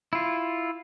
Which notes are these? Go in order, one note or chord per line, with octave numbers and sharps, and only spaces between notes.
E4 F4